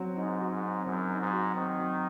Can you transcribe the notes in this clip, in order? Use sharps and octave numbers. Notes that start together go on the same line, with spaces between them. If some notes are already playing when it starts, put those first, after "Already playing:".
Already playing: F#3 C4 F#4
G#2 D#4
F#4
G#2
C4
F#2 F#3
D#4
G#2
F#4
D#3 C4
F#3